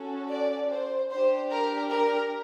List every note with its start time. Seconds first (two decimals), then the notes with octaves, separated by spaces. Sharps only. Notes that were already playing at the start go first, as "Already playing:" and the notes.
Already playing: C#4 F#4 A4
0.30 D5
0.71 C5
1.10 D4 G4 C5
1.51 A#4
1.90 A#4